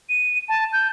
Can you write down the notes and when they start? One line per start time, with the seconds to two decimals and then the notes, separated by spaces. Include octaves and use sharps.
0.09 D#7
0.49 A5
0.73 G6